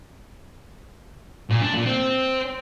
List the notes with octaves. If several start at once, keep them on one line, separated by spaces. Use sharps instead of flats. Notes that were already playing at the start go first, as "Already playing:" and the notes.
A#2
D4
A#2
C4